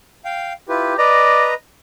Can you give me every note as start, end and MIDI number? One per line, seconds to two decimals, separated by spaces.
0.25 0.53 77
0.25 0.53 79
0.69 0.94 64
0.69 0.94 65
0.69 0.97 67
0.69 0.94 71
0.98 1.54 71
0.98 1.50 74
0.98 1.54 75
0.98 1.54 82